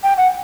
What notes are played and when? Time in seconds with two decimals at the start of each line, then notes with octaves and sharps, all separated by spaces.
0.04 G5
0.17 F#5